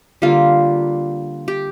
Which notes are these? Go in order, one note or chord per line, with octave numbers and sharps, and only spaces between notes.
D3 G3 A#3 F4
G4